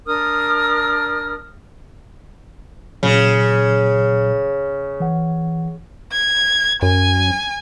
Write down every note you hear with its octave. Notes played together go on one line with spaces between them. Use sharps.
D4 A#4 D#6 F6
A#2 C#3 F#3
E3 F#5
G#6
F#2 G#5